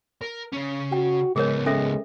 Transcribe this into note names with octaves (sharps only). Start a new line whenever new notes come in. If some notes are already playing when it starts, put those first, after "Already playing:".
A#4
C#3 C#4
F#4 G5
C#2 G#3 B3 G#4 A#4 C#5
G#3 C#4 A4 E5